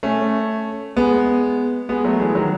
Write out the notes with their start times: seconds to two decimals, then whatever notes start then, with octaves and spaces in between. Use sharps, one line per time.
0.03 A3 C#4
0.96 G#3 B3
1.89 G#3 B3
2.04 F#3 A3
2.20 E3 G#3
2.35 D#3 F#3